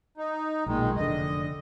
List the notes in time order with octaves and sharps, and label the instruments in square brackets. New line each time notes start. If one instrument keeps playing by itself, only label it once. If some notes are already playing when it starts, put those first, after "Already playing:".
[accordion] D#4
[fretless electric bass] B1 A#2 [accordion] D#3 G#3
[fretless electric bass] F1 D3 [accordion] D#5